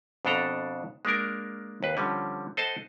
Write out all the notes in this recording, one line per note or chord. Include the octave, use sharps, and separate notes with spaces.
F2 B2 D4 A4 A#5
G#3 A#3 D4 A#4
D#2 B4
D3 F3 G3 C#4
A4 C5 D#5 F#5 A5